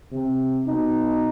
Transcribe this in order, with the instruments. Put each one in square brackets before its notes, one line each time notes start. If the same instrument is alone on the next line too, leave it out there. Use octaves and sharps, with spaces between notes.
[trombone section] C3
B2 D#4